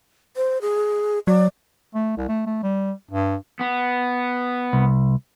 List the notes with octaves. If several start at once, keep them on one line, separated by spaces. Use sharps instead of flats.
C5
G#4
F#3 D5
A3
C2
A3
A3
G3
G2
B3
C2